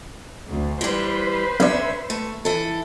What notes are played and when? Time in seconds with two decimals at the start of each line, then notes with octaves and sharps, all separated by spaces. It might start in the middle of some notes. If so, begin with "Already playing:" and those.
0.50 D2
0.81 E3 G3 B4 C5
1.60 B1 C#4 D4 E5
2.10 A3
2.45 E3 A4